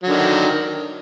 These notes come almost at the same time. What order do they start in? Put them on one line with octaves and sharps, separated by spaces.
F#3 D3 D#3